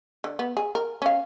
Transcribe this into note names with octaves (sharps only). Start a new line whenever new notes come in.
D3
B3
G#4
A#4
C#4 F5